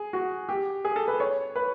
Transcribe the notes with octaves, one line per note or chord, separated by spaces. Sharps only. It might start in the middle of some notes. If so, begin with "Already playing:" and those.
Already playing: G#4
F#4
G4
G#4
A4
B4
C#5
B4